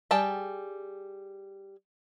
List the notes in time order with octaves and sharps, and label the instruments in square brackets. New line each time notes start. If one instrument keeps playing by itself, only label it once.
[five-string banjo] G3 G#4 G5 A5